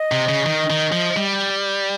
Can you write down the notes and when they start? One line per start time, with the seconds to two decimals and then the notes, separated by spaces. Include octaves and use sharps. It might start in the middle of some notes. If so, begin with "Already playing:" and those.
Already playing: D#5
0.12 C3
0.29 C#3
0.46 D#3
0.70 D#3
0.92 F3
1.17 G3